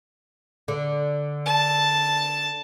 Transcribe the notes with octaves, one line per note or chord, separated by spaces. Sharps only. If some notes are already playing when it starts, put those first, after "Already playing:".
D3
A5